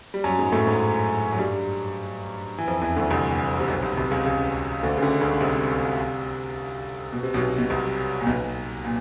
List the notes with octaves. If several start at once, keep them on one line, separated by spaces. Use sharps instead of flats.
G3
F#2 F#3
G#2 G#3
A2 A3
G#2 G#3
F#3
G2 G3
E3
F2 F3
E2 E3
D2 D3
C2 C3
C3
B1 B2
C2 C3
C2 C3
C#2 C#3
C#2 C#3
D2 D3
C#3
D2 D3
C#2 C#3
C2 C3
B2
C3
B1 B2
B2
C2 C3
A#2
B1 B2
A#2